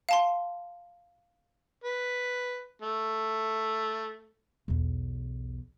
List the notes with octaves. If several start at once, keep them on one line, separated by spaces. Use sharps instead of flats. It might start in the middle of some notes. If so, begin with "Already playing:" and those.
F5 A5 C6
B4
A3
B1 E2